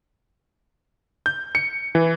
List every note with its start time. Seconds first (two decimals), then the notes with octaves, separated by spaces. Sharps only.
1.26 G6
1.55 C#7
1.95 E3